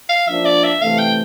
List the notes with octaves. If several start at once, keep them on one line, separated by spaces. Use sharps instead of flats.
F5
F3 A#3 D4 E5
D5
E5
C3 E3 A3 F5
G5